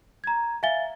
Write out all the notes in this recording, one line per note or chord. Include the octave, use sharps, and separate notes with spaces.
A#5 G#6
E5 F5 G#5 A6 G7